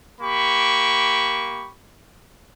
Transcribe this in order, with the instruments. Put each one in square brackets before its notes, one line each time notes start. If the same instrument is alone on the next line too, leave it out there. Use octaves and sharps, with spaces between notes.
[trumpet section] A#3 G4 B5 C#6